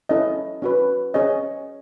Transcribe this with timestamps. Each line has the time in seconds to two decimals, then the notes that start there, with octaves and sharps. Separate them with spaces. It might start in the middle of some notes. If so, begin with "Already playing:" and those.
0.09 C#4 E4 A4 C#5 D#5
0.62 C#4 F#4 B4
1.14 C#4 G#4 C#5 D#5